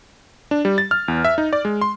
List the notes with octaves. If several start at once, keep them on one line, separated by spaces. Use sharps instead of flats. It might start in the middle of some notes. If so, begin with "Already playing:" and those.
D4
G3
A6
F6
E2
E5
D#4
D5
G#3
C6